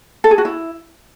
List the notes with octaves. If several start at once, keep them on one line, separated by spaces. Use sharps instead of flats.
A4
G#4
F#4
E4